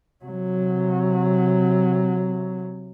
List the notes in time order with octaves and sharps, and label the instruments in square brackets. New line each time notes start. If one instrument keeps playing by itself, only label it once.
[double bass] C3 F#3